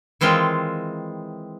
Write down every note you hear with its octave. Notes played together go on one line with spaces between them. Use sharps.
D#3 E3 G#3 C4 F4